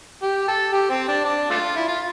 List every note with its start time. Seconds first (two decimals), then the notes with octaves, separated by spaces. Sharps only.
0.22 G4
0.48 A4
0.73 G4
0.90 C4
1.08 D4
1.25 D4
1.50 A3 D4 F4
1.76 E4
1.88 F4